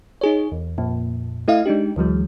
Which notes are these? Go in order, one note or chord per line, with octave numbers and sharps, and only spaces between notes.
D#4 G#4 C#5
E2
F2 A#2
A3 E4 D#5 F5
G#3 D4 D#4 G4
D2 E3 F#3 G#3